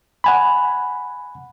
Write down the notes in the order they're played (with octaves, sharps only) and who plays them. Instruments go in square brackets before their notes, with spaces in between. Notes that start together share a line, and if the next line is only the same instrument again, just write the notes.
[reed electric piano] F#5 G#5 B5